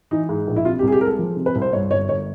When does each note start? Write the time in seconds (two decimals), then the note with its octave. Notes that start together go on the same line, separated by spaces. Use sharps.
0.11 E3 D#4
0.29 G#2
0.47 A#1
0.56 E4
0.65 C3 F4
0.79 G4
0.83 C2
0.88 G#4
0.92 G4
1.01 G#3 A#4
1.06 A4
1.19 F3
1.37 C3
1.46 B4
1.55 C2
1.62 C5
1.73 G2 C#5
1.91 G1 C#5
2.09 G1 C#5